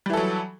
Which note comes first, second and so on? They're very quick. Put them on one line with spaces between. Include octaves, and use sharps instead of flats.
G3 E3 A4 F#3